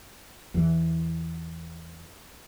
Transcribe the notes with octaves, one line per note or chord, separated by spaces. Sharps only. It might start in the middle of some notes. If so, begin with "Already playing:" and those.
E2 E3